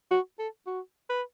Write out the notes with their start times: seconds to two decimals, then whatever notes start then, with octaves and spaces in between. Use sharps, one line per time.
0.11 F#4
0.39 A4
0.67 F#4
1.10 B4